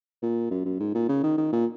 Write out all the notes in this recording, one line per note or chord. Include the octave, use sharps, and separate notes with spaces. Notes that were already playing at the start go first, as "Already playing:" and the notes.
A#2
F#2
F#2
G#2
A#2
C#3
D#3
D#3
A#2